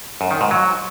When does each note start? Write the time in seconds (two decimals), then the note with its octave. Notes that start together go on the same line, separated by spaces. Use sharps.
0.21 F#2
0.31 D#3
0.41 G#2
0.51 F#3